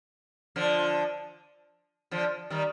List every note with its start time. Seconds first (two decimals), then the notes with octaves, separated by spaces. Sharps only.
0.56 D3 F3
2.11 D3 F3
2.50 D#3 G3